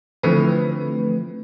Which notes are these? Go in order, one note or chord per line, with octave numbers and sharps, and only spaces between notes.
D3 E3 F3 A3 C4 B4